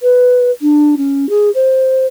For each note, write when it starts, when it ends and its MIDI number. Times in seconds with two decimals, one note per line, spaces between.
0.01 0.51 71
0.61 0.95 62
0.97 1.29 61
1.29 1.49 68
1.54 2.06 72